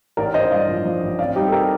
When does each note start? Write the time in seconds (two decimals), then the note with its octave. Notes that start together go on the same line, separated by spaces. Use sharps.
0.17 A1 A#4 D5
0.34 A1 C5 D#5
0.51 G2 D5 F5
0.69 F3
0.85 F3
1.03 A1
1.19 C4 D5 F5
1.35 G3 D#4 G4
1.48 A4
1.52 C4 G4 A#4